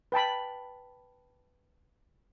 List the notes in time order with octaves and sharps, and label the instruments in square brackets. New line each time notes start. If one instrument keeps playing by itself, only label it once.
[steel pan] B4 G5 A5 B5